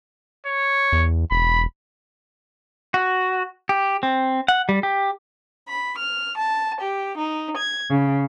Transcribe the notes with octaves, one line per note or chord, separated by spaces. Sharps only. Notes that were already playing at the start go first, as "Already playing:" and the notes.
C#5
E2
E1 B5
F#4
G4
C4
F#5
G3
G4
B5
F6
A5
G4
D#4
G#6
C#3